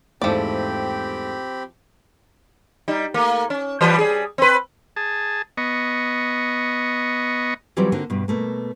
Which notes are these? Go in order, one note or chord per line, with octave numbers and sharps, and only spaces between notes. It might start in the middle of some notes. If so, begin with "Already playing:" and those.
E2 G#2 F3 A3 C4 G4 D5 B5
G3 D#4
A3 A#3
C#4
E3 G3 B4
G3 G#4
C4 B4
G#4 A5
B3 D#5 C#6
E3 F#3 G3 C4 F4 D5
D3 A#3 C4 D#4 F#4
G2 B2
B2 A3 A#3